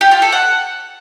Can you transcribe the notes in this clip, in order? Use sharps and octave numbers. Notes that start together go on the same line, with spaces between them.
G4
F4
A4
F#5